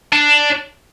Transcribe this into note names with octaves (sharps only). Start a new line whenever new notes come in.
D4